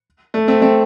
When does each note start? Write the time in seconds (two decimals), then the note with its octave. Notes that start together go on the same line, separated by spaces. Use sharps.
0.34 A3
0.48 A3 C4
0.62 A3 C4